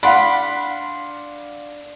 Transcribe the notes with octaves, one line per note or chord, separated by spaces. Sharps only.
D4 F5 F#5 B5 C6